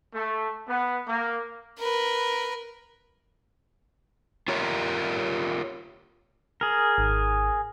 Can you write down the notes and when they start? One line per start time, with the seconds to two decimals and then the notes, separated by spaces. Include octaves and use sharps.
0.14 A3
0.68 B3
1.07 A#3
1.78 A#4 B4
4.48 F4 G4 A#4 C#5
6.61 G#4 A#4
6.98 G#1